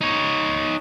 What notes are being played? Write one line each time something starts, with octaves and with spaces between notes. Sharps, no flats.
D#4 C#5